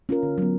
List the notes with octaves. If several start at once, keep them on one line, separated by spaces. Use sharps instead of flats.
C#4 F4 A#4
D3
F#3 B3